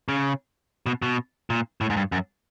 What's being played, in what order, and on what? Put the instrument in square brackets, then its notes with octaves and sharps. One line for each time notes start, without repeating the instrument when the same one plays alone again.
[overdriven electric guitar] C#3
B2
B2
A#2
A2
G#2
G2
F#2